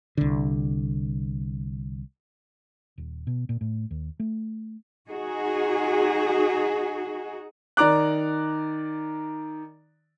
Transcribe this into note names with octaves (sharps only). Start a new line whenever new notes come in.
C2 D3
D#1
B2
A#2
A2
D#2
A3
D#4 F#4 G#4
D#3 D5 A#5 D6 F#6